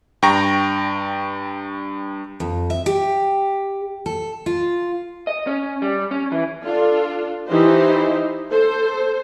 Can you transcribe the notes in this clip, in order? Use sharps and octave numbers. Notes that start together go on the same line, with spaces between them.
G2 G5 A#5 C#6 A#6
F2
E5
G4
A4
F4
D#5
C#4
G3
C#4
E3
D4 F4 A4
E3 D#4 E4 G4 C5 D#5
A4 C5